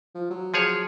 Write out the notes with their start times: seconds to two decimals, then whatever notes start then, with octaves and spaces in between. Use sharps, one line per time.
0.15 F3
0.30 F#3
0.54 F3 G#4 C#5